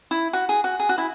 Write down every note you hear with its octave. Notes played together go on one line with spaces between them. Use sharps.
E4
F#4
G#4
F#4
G#4
F#4
E4